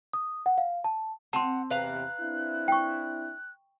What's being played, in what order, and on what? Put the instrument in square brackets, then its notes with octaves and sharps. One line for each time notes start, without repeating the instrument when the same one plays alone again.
[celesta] D#6
F#5
F5
A5
[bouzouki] C4 [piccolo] F#5 [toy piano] A5 C6
[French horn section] E2 C3 [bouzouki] B4 F5 A#5 [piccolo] F#6
[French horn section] C4 D4 E4
[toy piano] G5 C#6